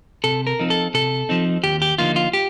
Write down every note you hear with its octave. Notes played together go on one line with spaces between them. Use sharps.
C3 A4
A#4
F3 C4 D#4
A4
C3 A4
F3 C4 D#4
D#2 G4
G4
D3 F3 A#3 D#4 F4
F4
G4